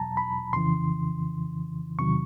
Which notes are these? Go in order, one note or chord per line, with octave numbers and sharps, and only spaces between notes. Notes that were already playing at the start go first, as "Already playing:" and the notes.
Already playing: E2 B2 F#3 A5 A#5
B5
F2 C#3 E3 C6
E2 C3 D#3 F#3 C#6